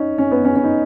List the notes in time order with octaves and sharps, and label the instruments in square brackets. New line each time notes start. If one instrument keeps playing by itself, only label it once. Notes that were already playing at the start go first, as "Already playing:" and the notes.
Already playing: [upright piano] C#4 D#4
C#4
B3
C#4
C#4
D#4